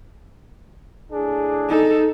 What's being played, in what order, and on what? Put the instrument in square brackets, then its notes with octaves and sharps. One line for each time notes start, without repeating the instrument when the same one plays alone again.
[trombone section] A2 D4 G#4
[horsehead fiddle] D#4 A4